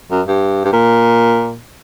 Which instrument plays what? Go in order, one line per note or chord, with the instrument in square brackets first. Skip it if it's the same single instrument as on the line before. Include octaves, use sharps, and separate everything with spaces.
[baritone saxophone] F#2
G2
G2
A#2